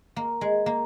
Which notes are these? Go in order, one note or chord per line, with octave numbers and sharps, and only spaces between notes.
A#3
G#3
A#3